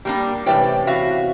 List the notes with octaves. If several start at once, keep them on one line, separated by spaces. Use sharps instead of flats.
G3 A#3 D4
C3 E3 A3 C#4 D5 G5
F#4 E5 F5